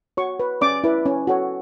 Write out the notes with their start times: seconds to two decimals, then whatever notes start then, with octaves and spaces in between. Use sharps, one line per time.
0.17 F#4 C#5 C#6
0.40 B4
0.61 C#4 D5 D6
0.84 E4 B4
1.06 C#4
1.27 F#4 A4 C#5